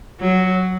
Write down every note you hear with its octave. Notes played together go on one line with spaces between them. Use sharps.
F#3